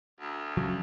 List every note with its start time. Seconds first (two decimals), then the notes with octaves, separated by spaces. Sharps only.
0.20 D2
0.57 C#3 F3 F#3